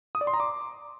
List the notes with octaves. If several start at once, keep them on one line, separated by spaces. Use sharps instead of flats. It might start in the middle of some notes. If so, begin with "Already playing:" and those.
D#6
D5
C6
A#5
D6